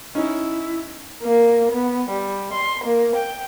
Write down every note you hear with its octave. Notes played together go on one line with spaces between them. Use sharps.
C#4 D#4 E4
A#3
B3
G3
C6
A#3
G5